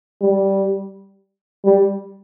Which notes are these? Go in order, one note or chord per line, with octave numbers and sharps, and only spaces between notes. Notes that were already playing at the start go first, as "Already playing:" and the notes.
G3
G3